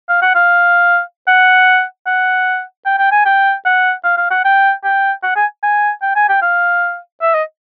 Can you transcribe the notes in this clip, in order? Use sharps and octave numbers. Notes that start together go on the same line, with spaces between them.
F5
F#5
F5
F#5
F#5
G5
G5
G#5
G5
F#5
F5
F5
F#5
G5
G5
F#5
G#5
G#5
G5
G#5
G5
F5
E5
D#5